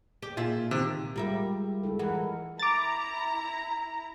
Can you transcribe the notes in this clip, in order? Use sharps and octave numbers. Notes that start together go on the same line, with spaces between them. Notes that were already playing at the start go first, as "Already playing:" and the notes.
G4
A#2 F4 G#4 E5
C3 D#3
G3 G#3 F4 G4 A#4 E5
G#3
G#3 E4 A4
E3 A#4 F#5
E4 A#5 D6 A6